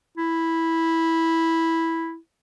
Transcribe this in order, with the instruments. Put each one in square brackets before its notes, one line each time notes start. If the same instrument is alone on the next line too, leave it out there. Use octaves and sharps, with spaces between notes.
[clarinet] E4